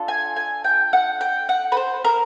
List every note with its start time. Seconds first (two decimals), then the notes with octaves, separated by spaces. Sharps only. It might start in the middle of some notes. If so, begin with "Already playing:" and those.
Already playing: D4 F4 A4
0.08 G#5
0.36 G#5
0.64 G5
0.93 F#5
1.21 G5
1.49 F#5
1.72 B4
1.77 C5
2.04 A#4